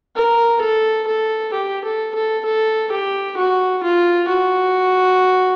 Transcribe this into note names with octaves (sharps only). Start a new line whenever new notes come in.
A#4
A4
A4
G4
A4
A4
A4
G4
F#4
F4
F#4